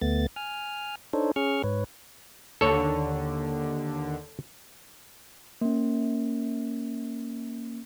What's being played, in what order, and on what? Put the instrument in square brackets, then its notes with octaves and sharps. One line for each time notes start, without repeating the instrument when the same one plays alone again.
[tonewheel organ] D2 A3 B3 A6
G#5 F6
D4 D#4 A4 C5 C#5
C#4 G#4 C#6 F6
G#2 B4 C#5
[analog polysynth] D#2 D3 [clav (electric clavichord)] A4 C#5
[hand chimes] A#3 C#4